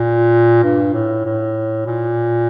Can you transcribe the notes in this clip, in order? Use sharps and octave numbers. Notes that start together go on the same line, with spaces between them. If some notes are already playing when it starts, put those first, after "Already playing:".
Already playing: A#2
G2
A2
A2
A#2